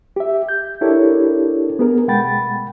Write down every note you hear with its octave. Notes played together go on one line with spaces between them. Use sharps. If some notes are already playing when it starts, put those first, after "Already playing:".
G4 E5
G6
D4 E4 G4 A4 A#4 C#5
B3 G#4 A#4
B2 G#3 F#5 G5 B5 A6